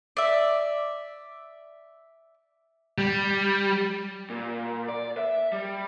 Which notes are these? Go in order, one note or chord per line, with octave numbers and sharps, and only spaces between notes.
D5 E5
G3
A#2
D5
E5
G3